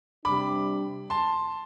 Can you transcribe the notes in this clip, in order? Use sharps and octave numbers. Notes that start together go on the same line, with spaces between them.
C3 G3 D4 B5 D6
A5 C6